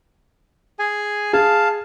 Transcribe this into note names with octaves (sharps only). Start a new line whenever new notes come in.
G#4 G#5
G#4 F5 A5